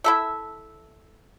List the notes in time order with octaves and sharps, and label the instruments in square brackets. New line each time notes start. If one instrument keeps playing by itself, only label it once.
[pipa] E4 A4 E5